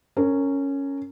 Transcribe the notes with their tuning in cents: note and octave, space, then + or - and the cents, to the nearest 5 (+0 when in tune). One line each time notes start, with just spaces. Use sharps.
C#4 +0 A#4 -25